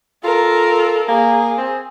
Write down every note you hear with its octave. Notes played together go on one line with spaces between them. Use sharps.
F4 A4 A#4
A#3 G#4
C4